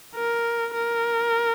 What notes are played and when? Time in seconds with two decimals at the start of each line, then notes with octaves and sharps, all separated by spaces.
0.15 A#4
0.74 A#4